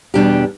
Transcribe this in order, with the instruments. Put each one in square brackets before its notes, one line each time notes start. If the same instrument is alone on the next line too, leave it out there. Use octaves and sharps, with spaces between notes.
[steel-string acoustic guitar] E2 B2 G3 D4 G4